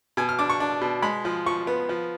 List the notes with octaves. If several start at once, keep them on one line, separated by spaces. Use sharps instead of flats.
B2 G#5
F6
D4 D6
C#6
D4
B2
G#3 B5
F3
F3 C#6
B3
F3